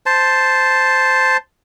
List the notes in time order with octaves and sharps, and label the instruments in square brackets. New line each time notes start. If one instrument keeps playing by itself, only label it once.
[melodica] C5 A5